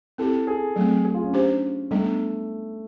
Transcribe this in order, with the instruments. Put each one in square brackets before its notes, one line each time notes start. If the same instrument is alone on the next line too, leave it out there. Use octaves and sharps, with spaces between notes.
[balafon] C4 E4 G4 [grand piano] A4
[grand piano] G#4
[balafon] F#3 A3 C4
[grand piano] G#4
F4
C#4
[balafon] D4 G4 C5
[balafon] G3 B3 D4 [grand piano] A3